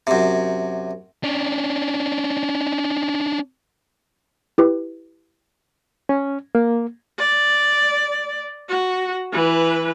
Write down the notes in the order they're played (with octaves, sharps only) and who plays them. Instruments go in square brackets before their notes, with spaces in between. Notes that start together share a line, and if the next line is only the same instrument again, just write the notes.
[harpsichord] F#2 C3
[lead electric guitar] C#4 D4
[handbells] E4 G4 B4
[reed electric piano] C#4
A#3
[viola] D5
F#4
E3 B4